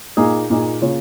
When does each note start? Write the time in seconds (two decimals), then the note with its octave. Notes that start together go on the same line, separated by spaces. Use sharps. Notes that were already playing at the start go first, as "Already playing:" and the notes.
0.17 A#2 A#3 D#4 G#4
0.50 A#2 A#3 D#4 G#4
0.82 C#3 A#3 F4 G#4 C#5